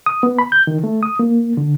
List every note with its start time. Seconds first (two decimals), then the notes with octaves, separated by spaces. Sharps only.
0.06 D#6
0.23 B3
0.39 B5
0.52 G6
0.67 D#3
0.84 A3
1.03 D#6
1.19 A#3
1.57 D3